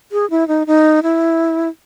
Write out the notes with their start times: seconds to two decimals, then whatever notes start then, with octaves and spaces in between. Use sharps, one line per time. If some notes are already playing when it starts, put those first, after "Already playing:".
0.12 G#4
0.30 E4
0.48 D#4
0.67 D#4
1.03 E4